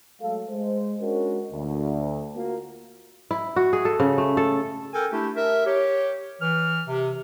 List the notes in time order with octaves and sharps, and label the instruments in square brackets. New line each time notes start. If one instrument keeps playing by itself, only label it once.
[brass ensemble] F#3 G#3 A3 A4 F5
G#3 C5
G#3 C#4 D4 F#4 A#4
D2
A#3 F4 F#4
[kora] E4
F#4
G#4
A4
C#3
A3
A4
[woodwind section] A4 A#4 G5 G#5
A3 D4 E4 G4
A#4 E5
G4 C#5
E3 F6
C3